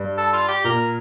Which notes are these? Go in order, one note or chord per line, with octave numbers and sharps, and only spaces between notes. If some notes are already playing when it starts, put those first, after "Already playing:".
Already playing: G2
A4
F4
G4
A#2 A#4